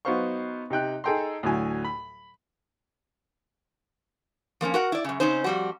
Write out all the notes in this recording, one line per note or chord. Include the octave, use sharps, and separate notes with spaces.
F#3 B3 D#4 C5 F5 C#6
C3 D#4 G5 F#6
D#4 G#4 A4 G5 A#5 C6
D2 A2 F#3 G#5
B5
F3 A#3 B3 C#4
F#4 A#4 F#5
E4 D5
F#2 C#3
C#3 C4 C#4 D#4 C5
F2 G3 F#4